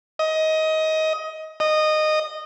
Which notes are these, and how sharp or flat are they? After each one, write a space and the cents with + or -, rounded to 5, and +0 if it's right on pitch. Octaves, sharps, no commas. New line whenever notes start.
D#5 +20
D#5 -15